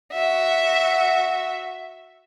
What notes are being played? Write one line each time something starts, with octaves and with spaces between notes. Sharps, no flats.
F#4 E5